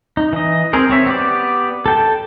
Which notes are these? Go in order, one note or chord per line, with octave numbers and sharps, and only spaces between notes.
D#4
E3 D#5
C4 G#4 A#4 C5
C4 C#5 E5
B3 G4 D5
A4 G5 A5